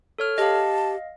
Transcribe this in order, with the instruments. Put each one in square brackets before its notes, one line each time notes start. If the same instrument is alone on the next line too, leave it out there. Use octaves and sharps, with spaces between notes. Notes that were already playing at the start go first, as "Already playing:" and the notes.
[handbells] A4 C#5 F6
[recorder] G4 [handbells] D#5 F5 [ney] A5